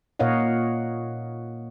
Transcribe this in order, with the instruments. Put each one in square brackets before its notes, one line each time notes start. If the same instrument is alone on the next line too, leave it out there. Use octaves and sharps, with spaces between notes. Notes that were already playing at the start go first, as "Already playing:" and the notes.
[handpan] A#2 A#4 C#5 D#5 F5 F#5